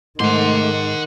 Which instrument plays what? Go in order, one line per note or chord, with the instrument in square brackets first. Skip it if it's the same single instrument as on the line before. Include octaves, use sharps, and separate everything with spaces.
[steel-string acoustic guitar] G#2 [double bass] D#3 [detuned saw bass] A3 [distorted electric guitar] F#5 C6